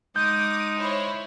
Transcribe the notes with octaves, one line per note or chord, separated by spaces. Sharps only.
G#3 D#4 D6 D#6 G6
E4 C5 C#5